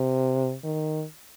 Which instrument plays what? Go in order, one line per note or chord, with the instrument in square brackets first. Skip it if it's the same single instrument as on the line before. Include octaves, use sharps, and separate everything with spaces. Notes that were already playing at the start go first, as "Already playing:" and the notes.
Already playing: [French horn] C3
D#3